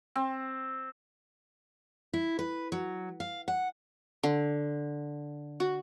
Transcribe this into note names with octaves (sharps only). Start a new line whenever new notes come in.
C4
E4
B4
F#3
F5
F#5
D3
F#4